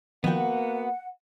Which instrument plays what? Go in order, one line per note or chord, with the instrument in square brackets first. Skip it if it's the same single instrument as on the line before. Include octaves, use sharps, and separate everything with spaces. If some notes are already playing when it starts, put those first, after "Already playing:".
[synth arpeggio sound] D#3 F3 G5 [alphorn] A#3 [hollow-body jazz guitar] B3 F#4 [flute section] F#5